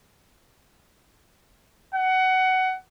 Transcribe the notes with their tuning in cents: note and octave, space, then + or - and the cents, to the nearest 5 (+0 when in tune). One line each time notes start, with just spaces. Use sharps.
F#5 +20